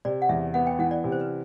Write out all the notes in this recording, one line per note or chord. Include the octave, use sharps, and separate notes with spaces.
C3 D5
F#5
E2 E5
B3 F#5
G5
E3 F#5
D5
C3
C5
B4